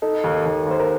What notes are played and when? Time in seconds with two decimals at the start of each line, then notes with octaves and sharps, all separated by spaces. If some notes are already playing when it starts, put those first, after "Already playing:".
0.02 D#4 A4
0.24 D#2
0.45 D#2
0.67 D#2 C5
0.80 A#4